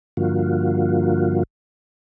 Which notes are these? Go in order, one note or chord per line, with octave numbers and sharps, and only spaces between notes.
G2 D3 F3 A#3 F4 F#4